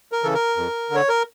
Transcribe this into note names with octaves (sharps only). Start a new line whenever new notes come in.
A#4
C#3 E3 A4
A#4
F2
D3
C#5
A#4